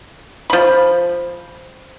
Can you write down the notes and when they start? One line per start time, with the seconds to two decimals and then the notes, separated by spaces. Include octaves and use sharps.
0.50 F3 B5